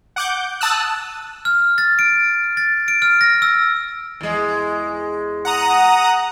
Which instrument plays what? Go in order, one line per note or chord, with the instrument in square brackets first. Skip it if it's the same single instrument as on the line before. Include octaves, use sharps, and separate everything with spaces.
[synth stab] F#5 D6 G6
A5 D#6 E6 F#6
[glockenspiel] F6
A6
D7
A6
D7
F6
A#6
E6
[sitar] E2 G#3
[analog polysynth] F#5 A#5 D#6